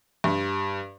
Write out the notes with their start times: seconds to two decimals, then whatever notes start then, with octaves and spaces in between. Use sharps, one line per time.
0.24 G2